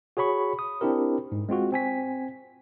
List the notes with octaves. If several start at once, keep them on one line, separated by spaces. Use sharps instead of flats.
F#4 G#4 C#5 B5 C#6
D#6
C4 D4 E4 G4 A#4
G#2
G#3 C4 F4 F#4
C4 G#5 B6